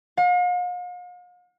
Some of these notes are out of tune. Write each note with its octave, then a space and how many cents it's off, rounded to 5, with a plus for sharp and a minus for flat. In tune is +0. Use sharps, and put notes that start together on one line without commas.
F5 +45